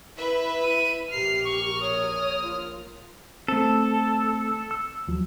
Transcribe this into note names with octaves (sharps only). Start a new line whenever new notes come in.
E4 B4 E5
D#7
A#1 G4 A#4 F6 C7
C#6
C#5 D#6
F4
A3 C4 A4
E6
D#2 F3 F#3